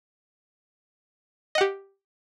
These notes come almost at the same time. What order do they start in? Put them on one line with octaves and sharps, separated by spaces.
D#5 F#5 G4